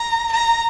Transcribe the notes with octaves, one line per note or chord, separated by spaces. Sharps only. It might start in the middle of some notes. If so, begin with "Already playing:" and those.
Already playing: A#5
A#5